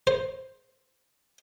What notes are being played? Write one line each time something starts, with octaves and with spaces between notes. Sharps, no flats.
C5